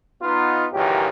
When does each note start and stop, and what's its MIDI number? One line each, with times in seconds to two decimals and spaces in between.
0.22 0.66 59
0.22 0.66 63
0.22 0.66 65
0.73 1.08 37
0.73 1.08 42
0.73 1.08 46
0.73 1.08 51
0.73 1.08 52
0.73 1.08 67